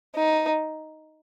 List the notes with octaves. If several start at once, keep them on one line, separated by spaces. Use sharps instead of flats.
D#4